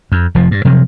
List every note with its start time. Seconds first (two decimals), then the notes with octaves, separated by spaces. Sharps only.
0.12 F2
0.35 F1 F2 F3
0.51 G2
0.65 C3 F3 F#3